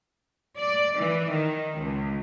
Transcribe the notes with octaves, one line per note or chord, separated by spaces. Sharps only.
D5
E3
D#3
C#2